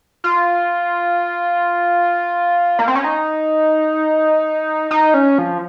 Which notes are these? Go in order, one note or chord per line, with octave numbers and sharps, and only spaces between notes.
F4
A#3
C4
C#4
D#4
D#4
C#4
F3